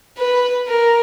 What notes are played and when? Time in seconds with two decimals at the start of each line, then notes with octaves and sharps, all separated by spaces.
0.18 B4
0.68 A#4